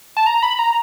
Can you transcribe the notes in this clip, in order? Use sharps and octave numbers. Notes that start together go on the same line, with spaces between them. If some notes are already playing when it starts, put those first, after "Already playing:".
A5
A#5
B5
A#5